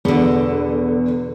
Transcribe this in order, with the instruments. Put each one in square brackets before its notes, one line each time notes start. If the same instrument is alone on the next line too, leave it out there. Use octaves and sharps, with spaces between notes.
[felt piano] E2 [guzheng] B2 D3